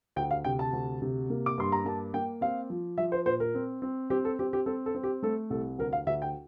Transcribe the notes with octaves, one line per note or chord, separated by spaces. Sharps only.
D2 G5
F5
C3 G5
A5
D2
C3
A#3
D6
G2 C6
A#5
A#3 A5
A#3 G5
C4 F5
F3
F3 E5
C5
A#2 C5
A#4
C4
C4
C4 G4
A4
C4 G4
G4
C4 A4
A4
C4
G4
A3 A4
C2 A4
D2 A#4
F5
D2 E5
G5